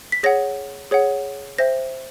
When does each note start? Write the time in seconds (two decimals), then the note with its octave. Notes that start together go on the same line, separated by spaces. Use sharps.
0.12 B6
0.23 G#4 C#5 F#5 A#6
0.91 G#4 C#5 F#5
1.58 C5 E5 G5 A#6